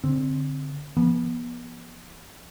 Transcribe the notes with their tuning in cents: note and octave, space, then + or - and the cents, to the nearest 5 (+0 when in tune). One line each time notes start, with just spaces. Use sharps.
D3 -15 C4 +5
F3 -30 B3 -35